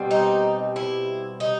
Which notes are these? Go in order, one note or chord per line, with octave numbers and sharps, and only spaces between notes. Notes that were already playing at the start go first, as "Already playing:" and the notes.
Already playing: B2 G3 C4
D#4
E4
D#4